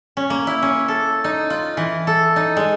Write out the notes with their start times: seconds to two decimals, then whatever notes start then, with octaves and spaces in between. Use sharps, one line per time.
0.17 C#4
0.30 A#3
0.47 E4
0.63 C#4
0.88 A4
1.24 D#4
1.50 F4
1.77 E3
2.07 A4
2.36 D#4
2.57 G#3